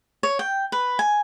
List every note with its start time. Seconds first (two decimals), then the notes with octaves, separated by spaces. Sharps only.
0.23 C#5
0.39 G5
0.72 B4
0.99 G#5